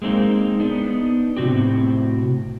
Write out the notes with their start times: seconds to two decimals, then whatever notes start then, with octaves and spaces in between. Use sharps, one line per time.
0.02 G#3 A#3 C4 D4 D#4
0.60 B3 D4 D#4
1.37 A2 C3 C4 F#4 G4